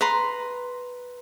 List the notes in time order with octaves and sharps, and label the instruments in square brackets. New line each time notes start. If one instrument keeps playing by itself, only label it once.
[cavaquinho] B4 A#5 C6